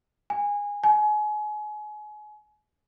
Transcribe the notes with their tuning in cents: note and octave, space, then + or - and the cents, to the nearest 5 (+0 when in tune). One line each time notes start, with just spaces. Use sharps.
G#5 -20
G#5 +30